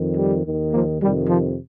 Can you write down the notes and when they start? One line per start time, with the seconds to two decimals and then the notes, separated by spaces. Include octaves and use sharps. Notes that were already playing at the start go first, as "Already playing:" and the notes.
Already playing: F2 D#3
0.16 G3
0.45 D#2 D#3
0.72 F3 A#3
1.01 F2 C3 D#3 G3
1.29 F3